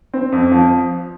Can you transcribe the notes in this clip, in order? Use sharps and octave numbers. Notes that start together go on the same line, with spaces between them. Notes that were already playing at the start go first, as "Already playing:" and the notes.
C4
F2
F3